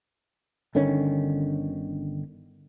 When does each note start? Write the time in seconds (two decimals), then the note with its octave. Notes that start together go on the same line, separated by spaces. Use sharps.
0.75 G1 D3 D#3 C#4